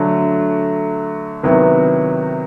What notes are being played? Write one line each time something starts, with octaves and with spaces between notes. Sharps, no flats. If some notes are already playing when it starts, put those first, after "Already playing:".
Already playing: D3 F#3 A3
C3 D#3 F#3 B3 E4